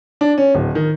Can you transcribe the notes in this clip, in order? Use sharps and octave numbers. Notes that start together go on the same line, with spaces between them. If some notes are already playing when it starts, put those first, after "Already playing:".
D4
C#4
D1
D#3